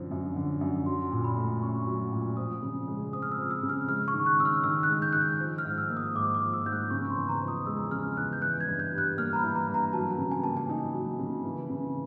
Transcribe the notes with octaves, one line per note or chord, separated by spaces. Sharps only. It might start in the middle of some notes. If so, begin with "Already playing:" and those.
Already playing: F#2 D3 F3
F#2
D3
F#2
F#3 C6
A#2
B5
A3
C#4 C#6
F#3
A#2
F3 D#6
C#3
G#3
C4 D#6
F6
E6
F3
E6
C#3
F6
G#3 F6
C#6
D#3
F#6
C#4 E6
F6
D#3 E6
F#6
G#3
G6
D#3 F#6
G6
F3
F6
G#2
E6
A#3
D#6
G#2 D6
D6
F3
E6
G#2 G6
F#6
C#3 C#6
C6
E2
A#5
F3
D#6
G#3 E6
C#3 F6
E2 F#6
G6
E3 F#6
G#6
G2
G6
G3
F#6
A#3 F6
A#5
B5
E3
A#5
G2
A#5
F#3 A5
C#3
G#5
A#3 A5
G#5
D#4
F#3
C#3
E3
C#3